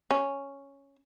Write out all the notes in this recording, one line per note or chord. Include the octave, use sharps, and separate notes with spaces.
C#4